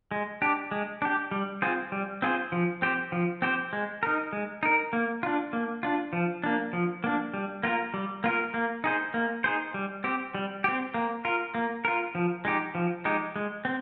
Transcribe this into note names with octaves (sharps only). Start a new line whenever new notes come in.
G#3
D4 G4
G#3
D4 G4
G3
C4 F4 G#4 C5
G3
C4 F4 G#4 C5
F3
C4 G4 C5
F3
C4 G4 C5
G#3
D#4 A#4
G#3
D#4 A#4
A#3
D4 F4
A#3
D4 F4
F3
A#3 D4
F3
A#3 D4
G3
A#3 F4 A#4
G3
A#3 F4 A#4
A#3
D#4 G#4 C5
A#3
D#4 G#4 C5
G3
C4 G4
G3
C4 G4
A#3
F4 A#4
A#3
F4 A#4
F3
G#3 D#4 G4
F3
G#3 D#4 G4
G#3
C4